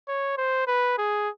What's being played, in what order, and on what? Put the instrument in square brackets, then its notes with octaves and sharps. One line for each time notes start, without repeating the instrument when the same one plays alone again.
[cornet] C#5
C5
B4
G#4